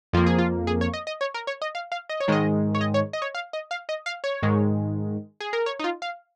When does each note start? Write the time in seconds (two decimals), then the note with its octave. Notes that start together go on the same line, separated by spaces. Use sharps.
0.13 F2 F3 A#3 F4
0.26 G#4
0.39 F4
0.67 G#4
0.81 C#5
0.94 D#5
1.07 D#5
1.21 C#5
1.34 A#4
1.47 C#5
1.62 D#5
1.75 F5
1.92 F5
2.09 D#5
2.20 C#5
2.28 G#2 D#3 G#3 D#5
2.75 C#5
2.81 D#5
2.94 C#5
3.13 D#5
3.22 C#5
3.35 F5
3.53 D#5
3.71 F5
3.89 D#5
4.06 F5
4.24 C#5
4.43 G#2 D#3 G#3
5.40 G#4
5.53 A#4
5.66 C#5
5.79 D#4
5.84 F4
6.02 F5